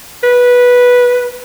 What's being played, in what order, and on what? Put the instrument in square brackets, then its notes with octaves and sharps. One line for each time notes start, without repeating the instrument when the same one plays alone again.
[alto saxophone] B4